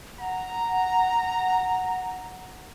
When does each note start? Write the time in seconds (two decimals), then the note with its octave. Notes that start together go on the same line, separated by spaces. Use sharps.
0.19 F#5 A#5